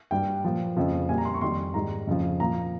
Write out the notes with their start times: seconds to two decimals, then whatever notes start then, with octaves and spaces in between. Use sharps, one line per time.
0.11 G2 G3 G5
0.45 A#2 F3
0.77 F2 C#3 F3
1.09 A#2 G3 G#5
1.18 A#5
1.25 C6
1.34 C#6
1.41 F2 D#3 G3 C6
1.74 G#2 D#3 G3 A#5
2.07 F2 C#3 F3
2.40 A#2 F3 A#5